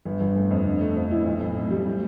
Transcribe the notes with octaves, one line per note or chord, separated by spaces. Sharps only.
G1
G1
A3
F2
D3
A3
F2
E4
B1
A2
A2
G3
A2